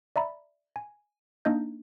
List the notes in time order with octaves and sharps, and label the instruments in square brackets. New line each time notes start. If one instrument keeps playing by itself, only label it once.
[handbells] D5 E5 A#5 B5
G#5
A#3 D4 D#4 D#5 G6